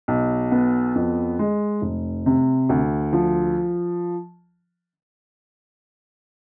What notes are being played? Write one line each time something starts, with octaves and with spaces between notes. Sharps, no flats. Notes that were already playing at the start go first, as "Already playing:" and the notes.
B1
B3
F2
G#3
F1
C3
D2
F3